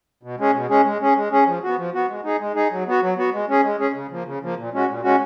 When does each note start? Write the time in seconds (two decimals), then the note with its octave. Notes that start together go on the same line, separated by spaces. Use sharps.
0.23 B2
0.38 G#3 C#4 G#4
0.54 B2
0.69 G#3 C#4 G#4
0.85 G#3
1.01 C#4 G#4
1.16 G#3
1.32 C#4 G#4
1.46 F3
1.63 B3 F#4
1.78 F3
1.94 B3 F#4
2.08 G#3
2.24 D#4 G#4
2.40 G#3
2.55 D#4 G#4
2.71 F#3
2.87 B3 F#4
3.02 F#3
3.17 B3 F#4
3.33 G#3
3.49 C#4 G#4
3.64 G#3
3.79 C#4 G#4
3.94 C#3
4.11 F3 A#3
4.26 C#3
4.42 F3 A#3
4.57 A#2
4.73 G#3 C#4 F#4
4.89 A#2
5.03 G#3 C#4 F#4